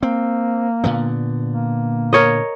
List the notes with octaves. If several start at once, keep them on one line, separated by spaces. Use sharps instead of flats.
A#3 C4
A#2 D3 B3
A#3
A#4 C#5 D#5